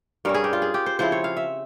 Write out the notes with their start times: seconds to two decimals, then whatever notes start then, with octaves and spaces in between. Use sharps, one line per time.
0.25 G2 G3 C#4 A#4
0.34 G#4
0.44 G4
0.53 F4
0.62 G#4
0.74 G4
0.86 C5
0.99 C#3 F3 C4 E4 C5
1.12 C#5
1.24 F5
1.37 E5